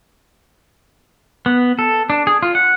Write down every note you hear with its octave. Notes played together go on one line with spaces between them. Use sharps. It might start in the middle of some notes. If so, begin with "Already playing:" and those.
B3
A4
D4
G#4
F4
F#5